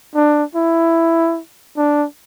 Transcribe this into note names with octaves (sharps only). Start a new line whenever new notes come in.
D4
E4
D4